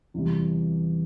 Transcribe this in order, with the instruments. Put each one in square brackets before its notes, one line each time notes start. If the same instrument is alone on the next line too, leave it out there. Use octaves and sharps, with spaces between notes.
[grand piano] E2 C3 E3 G3